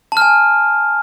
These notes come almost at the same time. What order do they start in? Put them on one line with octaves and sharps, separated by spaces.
A5 F6 G#5